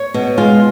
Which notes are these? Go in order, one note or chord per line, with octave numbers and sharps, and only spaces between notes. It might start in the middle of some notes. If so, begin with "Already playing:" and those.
Already playing: C#5
B2
G#3 F4